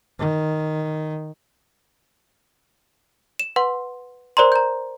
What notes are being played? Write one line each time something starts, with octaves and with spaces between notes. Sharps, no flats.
D#3
E7
B4 F#5 C6
A#4 C5 D5 A#5 C6
A#5 G6